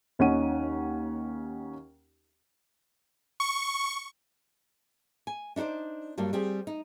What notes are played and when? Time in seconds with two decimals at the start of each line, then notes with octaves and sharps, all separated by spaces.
0.19 D#2 C#4 D#4 F#5 D#7
3.40 C#6
5.27 G#5
5.56 D4 D#4 F#4 C5 D5
6.18 G2 F#3 G3 A#3
6.33 G3 C4 G4 G#4
6.67 D#4